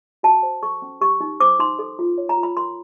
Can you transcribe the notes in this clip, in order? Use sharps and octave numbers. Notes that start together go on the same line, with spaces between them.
F#4 A5
C5
A4 C#6
C#4
G4 C#6
D#4
C5 D6
D#4 C6
A4
F4
C#5
A#5
F4
B5
A#4 C6